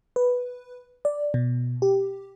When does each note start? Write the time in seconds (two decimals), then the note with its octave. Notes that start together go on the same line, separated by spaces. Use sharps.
0.16 B4
1.05 D5
1.34 B2
1.82 G4